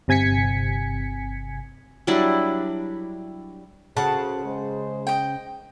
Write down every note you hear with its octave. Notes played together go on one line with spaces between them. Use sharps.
G1 C3 G#5 G#6 B6 C#7
F#3 G3 D4 E4
C#3 F#4 A4 C5 F#5 A5
G#3 C5
D#5 G5